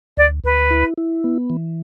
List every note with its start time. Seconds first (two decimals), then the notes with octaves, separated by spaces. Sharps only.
0.17 D2 D5
0.44 D2 B4
0.71 E4
0.98 E4
1.24 B3
1.50 E3